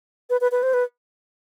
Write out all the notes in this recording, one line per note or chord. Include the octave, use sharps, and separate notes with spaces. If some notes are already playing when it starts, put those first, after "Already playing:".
B4
B4
B4
C5
B4